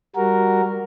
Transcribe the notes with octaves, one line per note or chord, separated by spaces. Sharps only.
G3 F#4 A#4